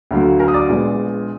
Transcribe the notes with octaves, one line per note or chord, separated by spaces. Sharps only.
D2 D3 F#3 A#3
A#4 A#5
D#6
D5 D6
A#1 A#2 G#3 B3